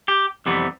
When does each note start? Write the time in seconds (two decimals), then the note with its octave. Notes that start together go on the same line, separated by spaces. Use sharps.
0.08 G4
0.46 F2 C3 E3 G3 B3